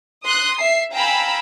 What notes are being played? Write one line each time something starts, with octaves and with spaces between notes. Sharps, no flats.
C6 D#6 F#6
E5 C7
F5 G5 G#5 A#5 B5 E6